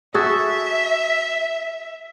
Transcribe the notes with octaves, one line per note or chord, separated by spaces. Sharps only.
F#4 G#4 A4 E5